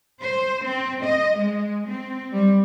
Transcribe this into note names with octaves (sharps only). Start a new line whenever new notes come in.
C5
C4
D#5
G#3
C4
G3